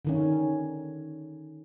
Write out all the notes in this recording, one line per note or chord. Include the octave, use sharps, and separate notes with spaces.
D3 D#3 C#4